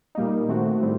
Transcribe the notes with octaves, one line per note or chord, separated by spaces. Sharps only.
A#2 G3 A#3 D#4
D#3 A3 C4 F#4
A2 G3 C4